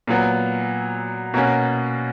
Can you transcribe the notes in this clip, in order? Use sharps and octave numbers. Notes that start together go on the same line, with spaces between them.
A#2 F#3 B3
B2 A#3 C#4 F#4